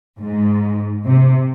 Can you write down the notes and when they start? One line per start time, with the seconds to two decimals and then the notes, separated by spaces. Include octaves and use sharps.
0.18 G#2
1.04 C3